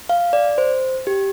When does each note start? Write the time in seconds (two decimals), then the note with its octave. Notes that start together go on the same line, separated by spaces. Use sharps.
0.09 F5
0.33 D5
0.58 C5
1.07 G4